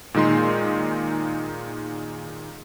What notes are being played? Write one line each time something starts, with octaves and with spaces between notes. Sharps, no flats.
A#2 D#3 G#3 D#4 C6